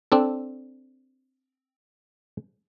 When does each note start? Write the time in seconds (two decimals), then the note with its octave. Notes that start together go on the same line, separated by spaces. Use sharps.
0.12 C4 D4 A4